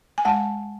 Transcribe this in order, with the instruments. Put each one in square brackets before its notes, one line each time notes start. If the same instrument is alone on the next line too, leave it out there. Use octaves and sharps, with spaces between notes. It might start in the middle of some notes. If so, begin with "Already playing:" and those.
[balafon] G#5
G#3 F#5 A5